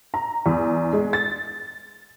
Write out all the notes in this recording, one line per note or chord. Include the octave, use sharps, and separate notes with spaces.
A#5
E2
G#3
A6